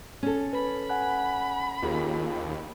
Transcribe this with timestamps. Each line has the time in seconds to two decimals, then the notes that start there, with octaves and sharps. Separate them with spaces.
0.23 C#4 A4
0.53 B4 B5
0.89 F#5 G#5 F#6
1.82 D#2 F4 G#4